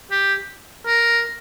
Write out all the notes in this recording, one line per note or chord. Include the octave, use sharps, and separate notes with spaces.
G4
A#4